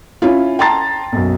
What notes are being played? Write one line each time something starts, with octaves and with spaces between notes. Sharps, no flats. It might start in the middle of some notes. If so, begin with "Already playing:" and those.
C#4 E4 F4
G5 A5 A#5 C6 A6
B1 F#2